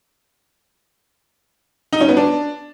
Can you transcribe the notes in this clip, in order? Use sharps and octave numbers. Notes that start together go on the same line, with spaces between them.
D#4
C#4
B3
D4